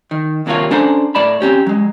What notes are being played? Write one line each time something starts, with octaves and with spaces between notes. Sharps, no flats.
D#3
D#2 C3 F#3 A#3 F4 C#5
C#4 D4 A4 C5 F#5 A#5
A2 D5 A5 B5
C4 C#4 G4 C#5
F#3 G#3